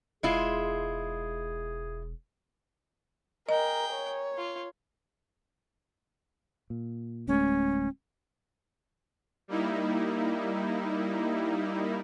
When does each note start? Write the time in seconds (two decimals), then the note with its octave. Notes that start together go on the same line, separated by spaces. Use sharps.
0.23 E1 G#3 E4 F4 G#4
3.49 G#4 A#4 D#5 G5
3.93 C#5
4.38 F4
6.70 A#2
7.27 D1 G#3 A3 C#4
9.48 G3 A#3 D#4 E4